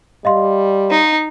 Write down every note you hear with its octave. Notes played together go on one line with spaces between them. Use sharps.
G3 D#5 F5 C6
D#4